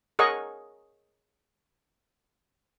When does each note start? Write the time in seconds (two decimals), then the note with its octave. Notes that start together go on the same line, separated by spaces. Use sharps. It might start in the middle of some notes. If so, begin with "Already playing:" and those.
0.19 G#4 A#4 C#5 D#5 F#5 C#6